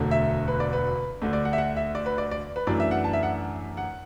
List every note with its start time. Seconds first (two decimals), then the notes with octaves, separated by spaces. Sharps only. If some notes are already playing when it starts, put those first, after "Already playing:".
Already playing: E1 D2 D3 F#3 A3
0.11 E5
0.48 B4
0.60 D5
0.73 B4
1.22 D2 D3 A3 D4
1.33 D5
1.45 F#5
1.53 E5
1.58 F#5
1.77 E5
1.95 D5
2.06 B4
2.18 D5
2.31 D5
2.56 B4
2.67 F#2 E3 A3 D4 D5
2.80 E5
2.91 F#5
3.04 A5
3.13 E5
3.23 F#5
3.77 F#5